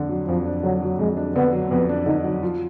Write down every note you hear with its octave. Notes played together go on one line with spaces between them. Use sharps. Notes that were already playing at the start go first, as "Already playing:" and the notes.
Already playing: F2 D3 D4
F#3
F2 F3
D4
D3 F#3
F#3
F2 G#3
D4
D3 B3
F#3
F2 B3
D4
D3 D#4
F#3
F3